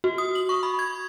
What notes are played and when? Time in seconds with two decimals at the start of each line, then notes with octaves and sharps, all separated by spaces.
0.04 F#4
0.18 D#6
0.35 F#7
0.49 C#6
0.63 B5
0.79 G#6